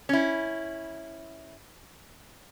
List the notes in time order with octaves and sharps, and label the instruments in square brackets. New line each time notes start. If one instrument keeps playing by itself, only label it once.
[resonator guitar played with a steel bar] C#4 E4